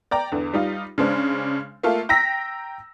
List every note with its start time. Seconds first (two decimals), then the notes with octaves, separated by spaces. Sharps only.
0.11 D5 G5 A#5
0.32 E2 D3
0.53 G3 D#4 F4
0.98 C#3 G#3 D4 C5
1.83 A3 A#3 F4 A4
2.09 G5 A#5 E6 A#6 B6